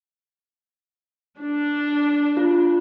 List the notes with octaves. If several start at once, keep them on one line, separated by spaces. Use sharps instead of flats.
D4
F4